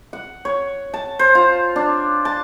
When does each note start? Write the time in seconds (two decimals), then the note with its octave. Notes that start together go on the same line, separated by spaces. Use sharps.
0.13 F#5
0.45 C#5
0.94 A5
1.19 C5
1.35 F4
1.76 D4
2.25 A5